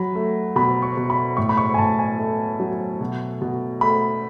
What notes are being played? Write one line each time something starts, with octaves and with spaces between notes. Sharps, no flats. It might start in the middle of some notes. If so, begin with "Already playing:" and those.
Already playing: F#3 B5
A3
B2 B5
C#6
B2
B5
A2 C#6
B5
C#6
G#5
A2 A5
G#5
A3
F#3
B2
B2
A3 B5